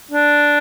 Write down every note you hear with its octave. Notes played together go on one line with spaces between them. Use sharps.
D4